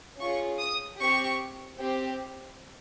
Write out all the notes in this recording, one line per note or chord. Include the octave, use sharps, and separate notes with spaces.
C#4 F4 G#4 C#6
D#6
C4 G4 C#6
C4 G4